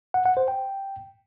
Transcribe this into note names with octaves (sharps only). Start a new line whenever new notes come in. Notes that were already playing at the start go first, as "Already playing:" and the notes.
F#5
F#5
C5
G5